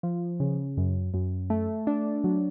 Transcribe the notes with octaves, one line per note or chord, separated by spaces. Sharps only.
F3
C#3
F#2
F#2
A3
D4
F#3